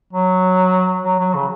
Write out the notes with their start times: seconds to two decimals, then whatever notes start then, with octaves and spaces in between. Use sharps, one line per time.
0.13 F#3
1.04 F#3
1.19 F#3
1.35 C#3